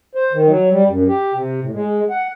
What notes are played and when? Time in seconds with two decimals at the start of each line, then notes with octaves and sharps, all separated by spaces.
0.15 C5
0.33 D#3
0.48 F#3
0.70 G3
0.87 F#2
1.08 G4
1.34 C3
1.61 A2
1.73 G#3
2.10 F#5